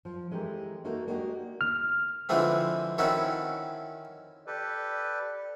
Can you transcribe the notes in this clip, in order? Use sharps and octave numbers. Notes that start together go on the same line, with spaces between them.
F3
E3 G#3 A3 C4 G4 A#4
A3 A#3 D#4 F#4 A4
G#3 A#3 D4 F#4 G4 D#5
F6
D3 E3 F3 G#3 A3 C4
D#3 C4 C#4 E4 F#4 A4
G4 A4 B4 D5